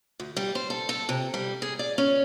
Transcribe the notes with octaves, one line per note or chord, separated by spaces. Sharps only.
D2
G3
C5
A4
A4
C3
G3
G#4
D5
C#4